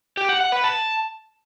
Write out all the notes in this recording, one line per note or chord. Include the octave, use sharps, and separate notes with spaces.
G4
F#5
F#5
B4
A5